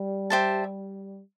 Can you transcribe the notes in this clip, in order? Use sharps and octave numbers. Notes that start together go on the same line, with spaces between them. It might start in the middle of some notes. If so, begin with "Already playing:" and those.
Already playing: G3
G4 C5 E5 A5